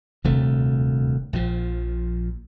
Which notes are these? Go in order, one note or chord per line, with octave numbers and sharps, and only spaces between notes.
D#1 D2 C3 A3
A#1 A#2 F3